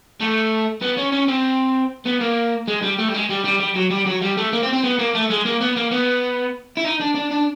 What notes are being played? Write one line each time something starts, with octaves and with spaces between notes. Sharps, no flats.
A3
B3
C#4
C#4
C4
B3
A#3
G#3
G3
A3
G3
G#3
G3
G3
G3
F#3
G3
F#3
G3
A3
A#3
C4
C4
B3
A#3
A3
G#3
A#3
B3
A#3
B3
E4
D#4
D4
D4
D4